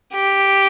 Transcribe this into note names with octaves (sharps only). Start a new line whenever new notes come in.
G4